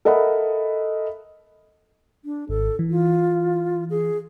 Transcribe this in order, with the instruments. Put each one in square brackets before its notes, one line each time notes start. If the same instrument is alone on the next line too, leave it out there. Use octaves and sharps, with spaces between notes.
[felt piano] A4 A#4 D#5 E5 F#5 B5
[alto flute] D4
[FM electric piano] G#1 [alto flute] A4
[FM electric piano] E3
[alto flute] F4
G#4